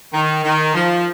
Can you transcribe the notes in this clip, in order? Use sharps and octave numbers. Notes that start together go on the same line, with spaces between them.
D#3
D#3
F3